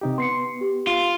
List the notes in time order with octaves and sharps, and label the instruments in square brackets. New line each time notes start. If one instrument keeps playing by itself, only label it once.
[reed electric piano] C3 D#4 G4
[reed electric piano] B3 [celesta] C6 C7 C#7
[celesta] G4
[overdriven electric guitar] F4